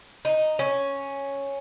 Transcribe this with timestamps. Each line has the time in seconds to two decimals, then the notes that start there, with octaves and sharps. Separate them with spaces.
0.25 D#4
0.59 C#4